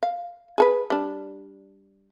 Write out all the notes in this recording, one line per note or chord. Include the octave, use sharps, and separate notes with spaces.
F5
G#4 A4 B4
G3 D4